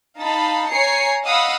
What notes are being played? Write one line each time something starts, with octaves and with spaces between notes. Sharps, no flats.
D#4 F5 A5 B5
C#5 G#5 A#5 C7 C#7
D#5 F5 F#5 B5 D#6 E6